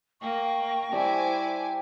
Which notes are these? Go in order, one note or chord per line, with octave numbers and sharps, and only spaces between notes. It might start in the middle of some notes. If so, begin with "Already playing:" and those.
A#3 D#5 G5 C#6
G3 E4 C5 E5 G#5 A5 D6